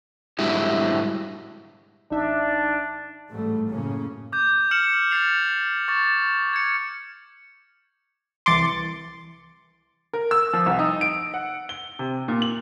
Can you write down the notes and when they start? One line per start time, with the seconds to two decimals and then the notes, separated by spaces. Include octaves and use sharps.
0.39 G#2 D3 F#3 G3 E4
2.11 A1 D4 D#4 E5
3.29 A1 G#2 G3 A3
3.69 F#2 A2 C#3 A#3 C#4
4.32 D6 G6
4.71 F6 C#7 E7 F#7
5.11 A6 C7 C#7 F7
5.88 C#6 D6 A6
6.53 G#6 C#7
8.46 C2 E3 C6 D6 A6 C#7
10.13 A#4
10.31 E6
10.53 F3
10.66 C2
10.79 D#4
11.01 D7
11.34 F#5
11.69 G7
11.99 C3
12.28 A#2
12.42 F#7